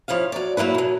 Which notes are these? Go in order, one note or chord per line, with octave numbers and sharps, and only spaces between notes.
F3 E4 C#5 F5
F#3 D5
F#3 A#3 E4 B4
B2 F#3